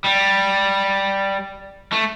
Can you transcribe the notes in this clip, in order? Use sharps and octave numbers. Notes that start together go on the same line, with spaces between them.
G3
A3